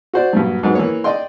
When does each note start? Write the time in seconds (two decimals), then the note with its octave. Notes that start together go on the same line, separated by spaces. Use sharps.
0.14 F#4 C5 D5
0.33 G2 A#2 F#3
0.63 G#2 F#3 B3
0.75 E3 A#3 C#5
1.04 D5 D#5 G5 C6